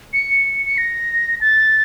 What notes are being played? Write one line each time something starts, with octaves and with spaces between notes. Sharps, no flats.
C#7
C#7
A#6
A6